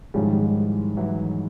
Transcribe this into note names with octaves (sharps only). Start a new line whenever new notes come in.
G#2 D#3 F3 G3 G#3 C#4 E4
E3 F#3